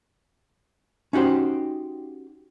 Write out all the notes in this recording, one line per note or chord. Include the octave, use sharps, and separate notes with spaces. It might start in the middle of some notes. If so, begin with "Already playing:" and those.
C#4 D#4 F#4 G4 C5